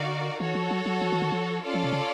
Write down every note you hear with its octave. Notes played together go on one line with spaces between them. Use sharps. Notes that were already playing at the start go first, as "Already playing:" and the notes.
Already playing: D3 D#4 F#4 A#4 D5 F5
E3 F#4 A4 C#5
F3
F#3
F#3
F3
E3
D#3
F3
C#4 F4 A4 D5 F5
F3
C3
C#3